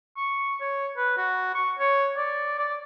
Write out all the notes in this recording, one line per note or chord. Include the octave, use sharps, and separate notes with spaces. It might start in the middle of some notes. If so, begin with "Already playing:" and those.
C#6
C#5
B4
F#4
C#6
C#5
D5
D5